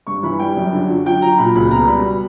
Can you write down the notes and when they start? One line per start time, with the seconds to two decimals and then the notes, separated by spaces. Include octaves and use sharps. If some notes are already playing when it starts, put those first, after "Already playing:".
0.07 G2 C#6
0.23 E3 B5
0.39 G3 G5
0.57 F#2
0.73 D3
0.90 F#3
1.06 F#3 G5
1.22 F#3 A#5
1.38 A#2 B5
1.55 C#2 B5
1.71 B2 A#5
1.87 G3 B5